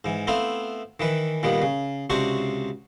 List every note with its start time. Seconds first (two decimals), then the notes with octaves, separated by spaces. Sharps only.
0.05 G#2 E3
0.27 A3 B3 C4 E4 F5
1.00 D#3 E3 B4
1.43 A#2 D#3 G3 B3
1.62 C#3
2.10 C#2 C3 D4 F#4 C5 C#6